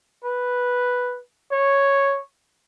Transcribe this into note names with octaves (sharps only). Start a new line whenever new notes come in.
B4
C#5